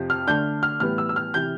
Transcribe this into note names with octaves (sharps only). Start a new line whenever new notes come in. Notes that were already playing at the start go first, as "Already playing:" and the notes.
Already playing: F2 C3 F3
F6
D3 A3 D4 G6
F6
A2 E3 G3 B3 F6
E6
E6
F6
C3 E3 G6